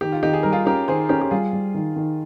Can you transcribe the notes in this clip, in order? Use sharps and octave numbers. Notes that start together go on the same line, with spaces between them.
D#3 G4
F4
D#3 D#4 G4
G#4
G3 A#4
F4 G#4
C#4 G4 A#4
D#3 G#4 C5
C#4 G4 A#4
G4
G3 F4 G#4
G3
D#3
D#3